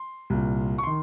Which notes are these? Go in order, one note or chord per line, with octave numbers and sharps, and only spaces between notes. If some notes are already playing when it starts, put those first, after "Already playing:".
Already playing: C6
C2 A#2
C#6
D#3 C6